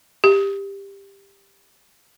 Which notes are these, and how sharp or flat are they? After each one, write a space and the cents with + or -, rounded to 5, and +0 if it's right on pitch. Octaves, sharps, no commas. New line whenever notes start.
G4 +15